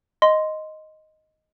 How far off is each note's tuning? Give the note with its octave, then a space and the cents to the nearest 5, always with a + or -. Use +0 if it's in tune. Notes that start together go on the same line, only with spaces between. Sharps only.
D#5 +0 C6 -5